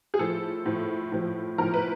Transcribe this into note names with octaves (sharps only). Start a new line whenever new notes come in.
G#4
A2 F3 A4
A2 F3
A2 F3
A2 F3 A#4
B4